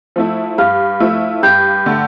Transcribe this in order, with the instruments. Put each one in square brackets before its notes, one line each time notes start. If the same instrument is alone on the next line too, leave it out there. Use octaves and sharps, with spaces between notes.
[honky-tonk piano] F3 A3 E4
[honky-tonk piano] G2 [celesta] F5 F6
[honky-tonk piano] F3 A3 E4
[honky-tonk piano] G2 [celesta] G5 G6
[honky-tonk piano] D3 A3